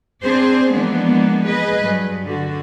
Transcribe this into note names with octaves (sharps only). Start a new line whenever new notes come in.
C4 D4 G#4 C5
E3 F3 G#3 A#3 B3 D4
G#4 B4 D#5
G2 F#3
D3 F#4